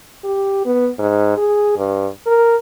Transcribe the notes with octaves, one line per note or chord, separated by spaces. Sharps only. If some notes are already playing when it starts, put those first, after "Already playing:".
G4
B3
G#2
G#4
G2
A#4